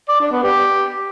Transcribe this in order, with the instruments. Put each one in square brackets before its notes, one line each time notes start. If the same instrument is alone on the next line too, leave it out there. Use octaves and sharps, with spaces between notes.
[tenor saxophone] D5
D4
B3
G4